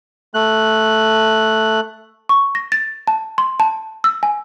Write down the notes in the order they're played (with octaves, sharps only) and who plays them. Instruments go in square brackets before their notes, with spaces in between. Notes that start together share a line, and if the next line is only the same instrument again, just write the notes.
[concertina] A3 F#6
[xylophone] C#6
A#6
A6
A5
C6
A5
E6
G#5